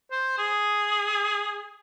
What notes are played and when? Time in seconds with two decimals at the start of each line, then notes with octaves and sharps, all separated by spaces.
0.11 C5
0.38 G#4